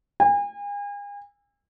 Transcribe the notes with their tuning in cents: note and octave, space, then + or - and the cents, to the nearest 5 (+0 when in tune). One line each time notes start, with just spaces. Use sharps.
G#5 -40